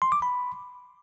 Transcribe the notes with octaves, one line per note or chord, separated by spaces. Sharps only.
C6
D6
B5